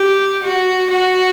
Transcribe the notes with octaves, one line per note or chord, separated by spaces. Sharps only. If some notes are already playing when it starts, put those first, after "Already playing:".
Already playing: G4
F#4
F#4